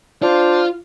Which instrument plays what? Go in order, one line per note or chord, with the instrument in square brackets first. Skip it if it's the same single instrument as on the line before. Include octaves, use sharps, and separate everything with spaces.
[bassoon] D4 [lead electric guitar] F4 [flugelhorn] C5